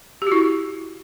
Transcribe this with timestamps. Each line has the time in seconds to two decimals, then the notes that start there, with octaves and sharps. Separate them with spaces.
0.22 G4
0.27 F#4
0.32 E4